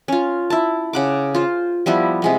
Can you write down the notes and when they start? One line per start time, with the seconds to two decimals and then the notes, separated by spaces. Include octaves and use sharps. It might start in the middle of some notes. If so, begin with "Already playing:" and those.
0.08 C#4 F4
0.50 E4 A5
0.93 C#3 F#5 D6
1.34 F4 C5
1.86 F3 G3 B3 E4
2.22 C3 G#3 B3